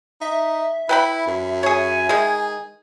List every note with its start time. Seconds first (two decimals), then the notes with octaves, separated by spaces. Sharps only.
0.21 D#4 E5
0.89 E4 B4 G5 B5
1.27 F#2
1.63 G#4 C#5 G#5
2.09 D#3 G#3 G#4